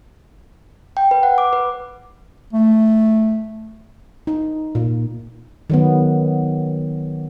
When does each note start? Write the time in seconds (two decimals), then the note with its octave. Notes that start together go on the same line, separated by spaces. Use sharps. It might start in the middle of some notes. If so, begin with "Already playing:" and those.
0.97 G5
1.11 B4
1.23 F#5
1.38 D6
1.53 B4
2.53 A3
4.27 D#4
4.75 A#2
5.70 D#3 F#3 B3